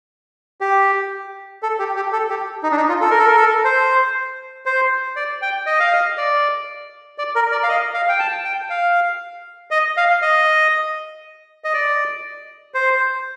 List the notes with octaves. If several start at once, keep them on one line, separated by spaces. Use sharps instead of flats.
G4
A4
G4
G4
A4
G4
D#4
D4
D#4
F4
A4
A#4
A4
A#4
A4
C5
C5
D5
G5
D#5
F5
D#5
D5
D5
A#4
D5
F5
D#5
F5
G5
A5
G5
F5
D#5
F5
D#5
D#5
D5
C5